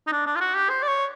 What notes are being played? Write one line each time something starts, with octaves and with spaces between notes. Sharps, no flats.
D#4
D4
D4
F4
F#4
G4
C5
D5
C#5